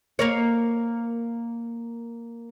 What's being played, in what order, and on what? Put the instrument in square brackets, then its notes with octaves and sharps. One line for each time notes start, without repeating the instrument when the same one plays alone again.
[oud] A#3 A#4 C#5